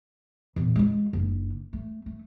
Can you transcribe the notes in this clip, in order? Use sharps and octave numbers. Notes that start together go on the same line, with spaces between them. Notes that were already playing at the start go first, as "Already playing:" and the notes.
E2 A#2
G#3 F4
F#1 D4
A3
A3